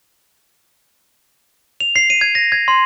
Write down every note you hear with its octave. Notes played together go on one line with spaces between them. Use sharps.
F7
C7
D#7
G#6
A#6
G#6
C6